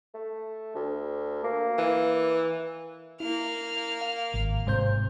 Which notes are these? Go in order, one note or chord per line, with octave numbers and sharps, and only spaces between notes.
A3
D2
A#3
E3
A#3 E4 F6
F5
G#1
G#2 C3 C5 G6